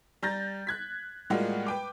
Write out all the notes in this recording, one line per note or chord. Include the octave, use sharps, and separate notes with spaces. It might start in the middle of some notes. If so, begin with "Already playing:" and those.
G3 A#5 G6 A6 A#6
F#6 G#6 B6
A2 G3 G#3 A#3 F4 F#4
B4 G5 D6